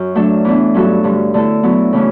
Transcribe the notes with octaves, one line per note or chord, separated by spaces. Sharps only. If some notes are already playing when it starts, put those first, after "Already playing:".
Already playing: F#2 F#4
F#3 A3 D4 A4
E3 B3 D4
G2 F#3 C#4 F#4 A4
G2 D3 G3
D3 A3 E4 A4
F#3 B3 E4
C#3 E3 A3 C#4